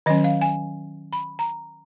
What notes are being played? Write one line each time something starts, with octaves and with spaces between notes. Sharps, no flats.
D#3 F#3 C#4 D#5
F5
G#5
B5
A#5